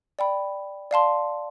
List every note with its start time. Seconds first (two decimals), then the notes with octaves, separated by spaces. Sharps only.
0.19 D5 G5 B5
0.91 D5 F5 A5 C6